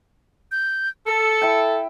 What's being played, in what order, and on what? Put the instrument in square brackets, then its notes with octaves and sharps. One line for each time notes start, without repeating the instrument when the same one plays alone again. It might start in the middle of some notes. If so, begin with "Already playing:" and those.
[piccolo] G6
[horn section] A4 [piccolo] C#7
[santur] E4 E5 G5